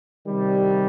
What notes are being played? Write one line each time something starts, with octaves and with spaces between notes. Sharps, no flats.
C3 D#3 G3